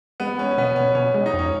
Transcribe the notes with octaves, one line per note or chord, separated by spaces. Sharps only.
G#3 B3
G#3 C#4
C#4
B2 B3
B2 C#4
B2 C#4
G#3
D#4
F2
C#4